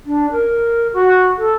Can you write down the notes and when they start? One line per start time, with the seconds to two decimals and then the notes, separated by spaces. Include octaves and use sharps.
0.06 D4
0.32 A#4
0.94 F#4
1.38 A4